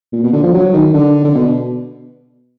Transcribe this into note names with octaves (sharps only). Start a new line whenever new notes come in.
A#2
B2
D3
F3
F#3
D#3
D3
D3
B2